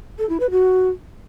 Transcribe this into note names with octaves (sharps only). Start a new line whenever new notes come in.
A4
E4
B4
F#4